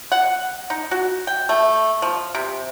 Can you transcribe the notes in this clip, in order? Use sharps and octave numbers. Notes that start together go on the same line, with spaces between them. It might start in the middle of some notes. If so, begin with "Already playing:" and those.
F#5
D#4
F#4
G5
A3
F3
C3